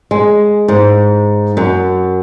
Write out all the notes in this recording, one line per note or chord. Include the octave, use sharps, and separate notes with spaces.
G#3
G#2
F#2